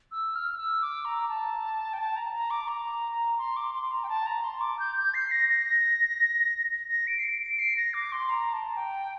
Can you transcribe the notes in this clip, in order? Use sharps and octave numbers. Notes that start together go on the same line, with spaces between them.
E6
F6
E6
D6
A#5
A5
G5
A5
A#5
A#5
D6
A#5
C6
D6
C6
A#5
G5
A5
A#5
C6
D6
G6
G6
C7
A#6
A#6
A#6
D7
C7
D7
D7
C7
A#6
D6
C6
A#5
A5
G5